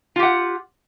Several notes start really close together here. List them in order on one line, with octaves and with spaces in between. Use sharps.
F4 G4 F#5